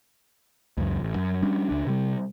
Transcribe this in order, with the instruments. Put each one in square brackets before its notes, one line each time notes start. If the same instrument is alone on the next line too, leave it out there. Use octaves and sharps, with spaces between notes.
[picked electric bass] C#2 F#2
A1
F#2
G3 C#4 D4
C#2 D4
C3 G3